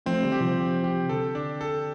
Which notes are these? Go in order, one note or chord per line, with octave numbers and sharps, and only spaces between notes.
F3 A3 C4
D3 G3
G4
C3 F3
G4
G4
D3 A4
D4
A4